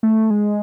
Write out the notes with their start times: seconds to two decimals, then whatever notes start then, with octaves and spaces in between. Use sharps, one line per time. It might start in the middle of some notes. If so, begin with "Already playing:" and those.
0.03 A3
0.30 G#3